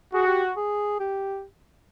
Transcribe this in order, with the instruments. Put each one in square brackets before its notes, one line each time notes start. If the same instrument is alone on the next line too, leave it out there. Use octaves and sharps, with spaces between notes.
[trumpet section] F#4 [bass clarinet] G#4
[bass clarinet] G4
G#4
G4